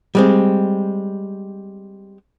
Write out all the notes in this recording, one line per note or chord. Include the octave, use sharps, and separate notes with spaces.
G3 G#3 C4